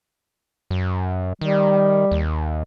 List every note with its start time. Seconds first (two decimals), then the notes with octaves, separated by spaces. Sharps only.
0.71 F#2
1.41 D#3 G3
2.11 D#2